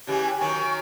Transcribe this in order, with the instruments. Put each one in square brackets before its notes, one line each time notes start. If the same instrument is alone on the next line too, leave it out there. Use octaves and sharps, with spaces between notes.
[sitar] C#3 E3 G#3 [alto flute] G4
[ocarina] G5
[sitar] D#3 F#3 [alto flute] G#5 [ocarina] C#6